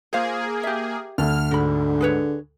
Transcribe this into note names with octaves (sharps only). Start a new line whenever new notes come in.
A#3 F4 G#4 C5 F5
G4 E5
D2 A4 F6
G#2 D3 F#4 B5
G#4 B4 C#5